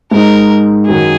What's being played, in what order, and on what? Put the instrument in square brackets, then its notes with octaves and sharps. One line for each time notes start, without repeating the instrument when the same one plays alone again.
[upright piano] G#2 G#3 D#4 [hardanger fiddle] A#4
[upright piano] F#2 D#3 F#3 [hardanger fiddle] G#4